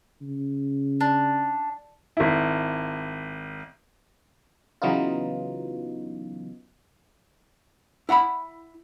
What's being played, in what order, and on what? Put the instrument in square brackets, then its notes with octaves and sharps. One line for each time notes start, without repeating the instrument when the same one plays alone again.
[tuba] C#3
[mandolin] D4
[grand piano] G#1 E4
[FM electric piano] C#3 E3 F#3 B3 D#4 F4
[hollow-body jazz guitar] E4 F#5 A#5 B5